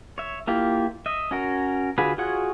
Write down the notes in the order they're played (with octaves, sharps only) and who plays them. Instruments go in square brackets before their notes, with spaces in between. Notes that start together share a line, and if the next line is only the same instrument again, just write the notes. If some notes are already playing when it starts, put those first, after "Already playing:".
[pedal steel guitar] C#5 E5
A#3 E4 F4 G4
D#5 E5
C#4 F#4 A#4
D3 F4 F#4 G#4 B4
F4 F#4 G#4 C#5 F#5